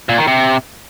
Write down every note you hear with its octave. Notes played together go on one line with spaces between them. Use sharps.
A#2
D#3
C3